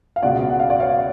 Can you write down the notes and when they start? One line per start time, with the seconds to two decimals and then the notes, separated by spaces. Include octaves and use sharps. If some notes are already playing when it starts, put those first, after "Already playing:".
0.16 F5
0.22 C#2 B2 G#3 D5 F#5
0.49 F#5
0.60 F5
0.70 D5
0.80 C#5 F5